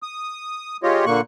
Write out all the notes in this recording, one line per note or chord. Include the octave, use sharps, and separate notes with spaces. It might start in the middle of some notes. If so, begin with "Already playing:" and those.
D#6
G#3 F4 G4 C#5 D#5
A#2 D3 A#3 C#6 F#6